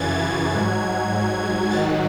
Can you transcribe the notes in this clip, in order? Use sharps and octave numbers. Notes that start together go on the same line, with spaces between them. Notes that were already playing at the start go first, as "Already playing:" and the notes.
Already playing: F#2 C#3 E3 G#6 A6
A6
G#2 F#3 G#6
G#2 D#3 F#3 A6